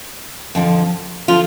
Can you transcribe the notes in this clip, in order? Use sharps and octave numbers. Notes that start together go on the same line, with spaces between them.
F2 D3 F3
D3 F3 F4